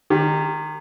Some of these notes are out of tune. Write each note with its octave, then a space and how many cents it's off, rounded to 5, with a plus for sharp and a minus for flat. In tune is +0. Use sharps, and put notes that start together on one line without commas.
D#3 -20 G4 +20